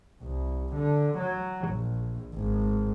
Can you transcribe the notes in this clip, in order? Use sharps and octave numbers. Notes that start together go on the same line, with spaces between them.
C2
D3
F#3
A#1
G#1